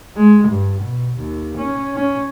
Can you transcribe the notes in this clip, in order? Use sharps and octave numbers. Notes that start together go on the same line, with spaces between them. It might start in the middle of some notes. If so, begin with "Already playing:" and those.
G#3
G2
B2
D#2
C#4
C#4